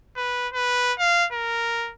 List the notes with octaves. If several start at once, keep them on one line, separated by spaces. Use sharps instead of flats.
B4
B4
F5
A#4